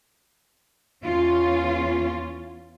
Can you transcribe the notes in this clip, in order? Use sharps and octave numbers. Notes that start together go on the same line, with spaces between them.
E2 C#4 F4